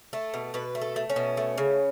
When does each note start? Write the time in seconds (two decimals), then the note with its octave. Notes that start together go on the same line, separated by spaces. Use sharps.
0.13 A3 A4
0.34 B2
0.54 B2 B4
0.75 A3
0.82 A4
0.96 A3
1.10 C#4
1.16 B2
1.37 A3
1.58 C#3